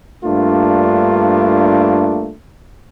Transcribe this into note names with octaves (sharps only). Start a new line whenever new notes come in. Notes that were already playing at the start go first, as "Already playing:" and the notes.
G2 A3 A#3 D4 F4